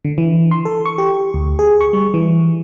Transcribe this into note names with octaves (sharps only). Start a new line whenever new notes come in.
D3
E3
C6
A4
C#6
G4
D2
G#4
C#6
G3
E3